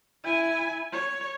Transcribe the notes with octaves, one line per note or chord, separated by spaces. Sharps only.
E4 G#5
C#5